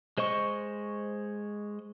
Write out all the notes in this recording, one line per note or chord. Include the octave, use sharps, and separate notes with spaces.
G#3 C5 D#5 C#6